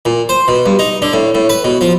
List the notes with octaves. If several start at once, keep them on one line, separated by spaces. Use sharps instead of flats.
A#2
C5
B2
G2
D#4
D3
A2
A2
B4
B2
F3